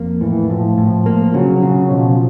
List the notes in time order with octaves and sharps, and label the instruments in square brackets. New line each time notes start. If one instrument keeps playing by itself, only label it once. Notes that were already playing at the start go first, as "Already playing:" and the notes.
Already playing: [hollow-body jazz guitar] F2 A#3
[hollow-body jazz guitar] A2 [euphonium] E3
[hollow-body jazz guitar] A2 [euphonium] F3
[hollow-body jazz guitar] A2
A#3
[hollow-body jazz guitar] C#3 [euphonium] F#3
[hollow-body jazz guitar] C#3
[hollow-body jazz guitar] B2 [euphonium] F3